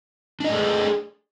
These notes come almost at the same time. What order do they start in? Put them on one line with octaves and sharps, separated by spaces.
D4 D#5 A3 G#4